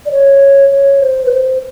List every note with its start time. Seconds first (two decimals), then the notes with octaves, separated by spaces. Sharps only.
0.06 D5
0.11 C#5
0.72 C#5
1.01 C5
1.26 B4
1.31 C5